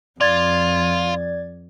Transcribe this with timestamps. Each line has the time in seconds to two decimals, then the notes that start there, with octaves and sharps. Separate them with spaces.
0.21 F2 F4 D5 G#6 A6